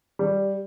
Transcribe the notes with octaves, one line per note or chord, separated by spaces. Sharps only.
G3